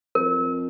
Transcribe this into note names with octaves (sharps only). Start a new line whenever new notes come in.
F2 A#4